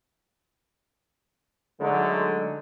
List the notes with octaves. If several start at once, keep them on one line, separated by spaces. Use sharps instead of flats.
D3 F#3 G#3 A3 D#4